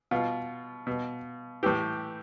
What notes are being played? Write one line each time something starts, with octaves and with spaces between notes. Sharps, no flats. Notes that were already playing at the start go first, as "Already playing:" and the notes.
B2 F4
B2
A2 E3 G4